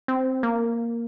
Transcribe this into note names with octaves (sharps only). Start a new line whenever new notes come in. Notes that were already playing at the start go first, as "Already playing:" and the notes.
C4
A#3